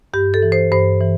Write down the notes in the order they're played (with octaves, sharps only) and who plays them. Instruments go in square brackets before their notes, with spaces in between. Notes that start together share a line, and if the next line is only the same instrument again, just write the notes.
[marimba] G2 G4
A4
E3
C5
G2 C5
E3